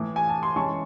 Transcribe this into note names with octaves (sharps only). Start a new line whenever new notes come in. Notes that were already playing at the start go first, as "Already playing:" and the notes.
Already playing: A2 E3 A3
G#5
A5
C6
E3 G#3 C#4 A5 C#6